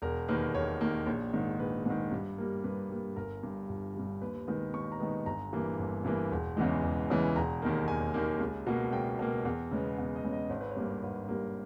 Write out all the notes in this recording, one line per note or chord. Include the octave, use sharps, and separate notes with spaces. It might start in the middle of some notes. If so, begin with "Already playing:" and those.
E1 A#4
D#2 D#3 A#3 B4
E1 C#5
D#2 D#3 A#3
A#1
G#2 D#3
A#1 B4
G#2 D#3
G2
G3 A#3
G2 B4
G3 A#3
G1 A#4
G2 G3
G1
G2 G3
D#2 B4
D#3 G#3 B3 D#5
D#2 C#6
A#5
D#3 G#3 B3
G1 A#5
G2 E3 A#3
G1
G2 E3 A#3
E1
E2 C#3 E3 G#3
E1
E2 C#3 E3 G#3
E1 A#5
D#2 D#3 A#3
E1 G#5
D#2 D#3 A#3
C#2
B2 A#3
C#2 G5
B2 A#3
E2
C#3 G#3 B3
E2
D#5
C#3 G#3 B3
D#5
G#1 C#5
B4
C#5
G2 G3 A#3
G#1 B4
G2 G3 A#3 A#4